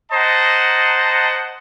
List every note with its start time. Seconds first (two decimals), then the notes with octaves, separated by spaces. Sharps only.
0.12 C5 D#5 F#5 A5 A#5